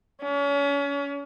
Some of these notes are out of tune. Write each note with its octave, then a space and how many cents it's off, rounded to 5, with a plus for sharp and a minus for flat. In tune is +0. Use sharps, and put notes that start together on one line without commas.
C#4 +35